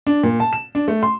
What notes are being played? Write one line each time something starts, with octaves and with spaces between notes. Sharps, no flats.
D4
A#2
A5
E7
D4
A3
C6